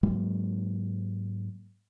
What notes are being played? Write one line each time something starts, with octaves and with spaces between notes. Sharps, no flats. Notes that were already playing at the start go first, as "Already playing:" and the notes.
G#2 F#3 G#3 A#3